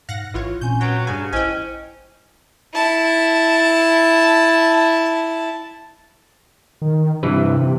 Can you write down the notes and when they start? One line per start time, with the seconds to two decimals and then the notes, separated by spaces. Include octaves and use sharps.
0.09 G#2 F5 F#5 A#6
0.34 A1 E3 F4 C#5
0.61 A#2 C4 C#4 G#5 G6
0.81 F#3 B4 G5
1.07 G2 C#3 G#5
1.33 A1 C#4 E4 C5 D#5 G5 G#5
2.75 E4 A5
6.82 D#3
7.23 G2 C3 E3 B4